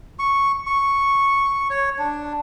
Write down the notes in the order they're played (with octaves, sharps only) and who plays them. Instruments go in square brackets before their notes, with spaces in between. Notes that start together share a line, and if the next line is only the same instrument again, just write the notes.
[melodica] C#6
C#6
C#5
D4